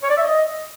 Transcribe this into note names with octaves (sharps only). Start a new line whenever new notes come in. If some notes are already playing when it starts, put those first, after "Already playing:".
C#5
D5
E5
D#5